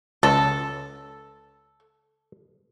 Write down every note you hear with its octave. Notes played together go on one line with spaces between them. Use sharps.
C#2 A4